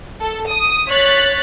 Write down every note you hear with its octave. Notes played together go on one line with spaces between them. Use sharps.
A4
D#6
C#5 F#6 A6 B6